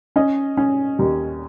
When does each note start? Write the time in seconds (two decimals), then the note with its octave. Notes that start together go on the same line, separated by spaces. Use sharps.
0.16 C#4 D#5
0.57 C#4
0.99 D#2